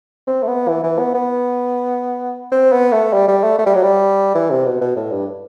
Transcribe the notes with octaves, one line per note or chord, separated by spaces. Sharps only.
C4
A3
B3
E3
E3
B3
B3
C4
B3
A3
G3
G3
A3
A3
G3
F#3
G3
E3
C3
B2
B2
A2
G2